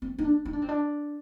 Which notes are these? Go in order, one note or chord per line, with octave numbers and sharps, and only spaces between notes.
C4
D#4
D4
D#4
D4
C4
D4